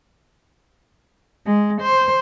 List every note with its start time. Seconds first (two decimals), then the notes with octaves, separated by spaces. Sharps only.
1.46 G#3
1.82 C5